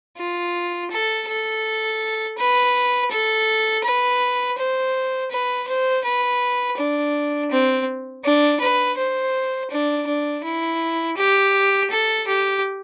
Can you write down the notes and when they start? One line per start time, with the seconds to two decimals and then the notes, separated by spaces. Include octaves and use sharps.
0.17 F4
0.91 A4
1.28 A4
2.38 B4
3.11 A4
3.84 B4
4.58 C5
5.31 B4
5.68 C5
6.04 B4
6.77 D4
7.51 C4
8.24 D4
8.61 B4
8.97 C5
9.70 D4
10.07 D4
10.44 E4
11.17 G4
11.91 A4
12.27 G4